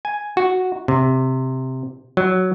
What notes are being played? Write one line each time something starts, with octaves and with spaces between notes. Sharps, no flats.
G#5
F#4
C3
F#3